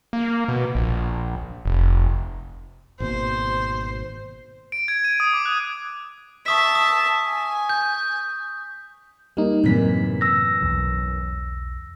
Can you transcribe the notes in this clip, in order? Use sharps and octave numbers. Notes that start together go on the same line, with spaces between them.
A#3
B2
A#1
F1
G#1 B2 A#3 C5
D7
G#6
D#7
D#6
D6
F#6
E5 A5 C#6 D#6 B6
D#6
G#5
G6
G3 A#3 D#4
F#2 A2 C3 E3 A#3 B6
E6 A#6
B1 E2